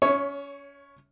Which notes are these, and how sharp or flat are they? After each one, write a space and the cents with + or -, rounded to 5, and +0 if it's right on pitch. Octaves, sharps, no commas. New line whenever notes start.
C#4 +25 C#5 +0 E5 -10